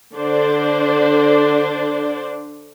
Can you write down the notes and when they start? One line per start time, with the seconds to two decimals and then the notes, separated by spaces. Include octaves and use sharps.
0.15 D3 D4 C5 D5